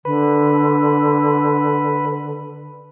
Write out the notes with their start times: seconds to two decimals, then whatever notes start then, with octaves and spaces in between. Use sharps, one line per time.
0.05 D3 B4